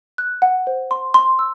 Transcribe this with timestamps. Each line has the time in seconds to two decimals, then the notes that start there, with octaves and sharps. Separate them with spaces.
0.18 F#6
0.42 F#5
0.67 C5
0.91 C6
1.14 C6
1.39 E6